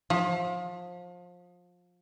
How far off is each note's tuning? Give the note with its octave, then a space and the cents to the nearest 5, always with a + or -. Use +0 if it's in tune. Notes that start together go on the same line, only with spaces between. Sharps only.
F3 +25